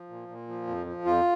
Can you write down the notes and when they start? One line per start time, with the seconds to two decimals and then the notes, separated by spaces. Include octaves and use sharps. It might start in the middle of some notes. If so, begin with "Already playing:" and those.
Already playing: F3
0.09 A#2
0.28 A#2
0.48 F3
0.67 F2
0.86 F3
1.05 F2 F4